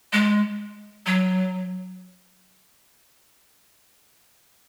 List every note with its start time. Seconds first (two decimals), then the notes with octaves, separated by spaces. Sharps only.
0.13 G#3
1.06 F#3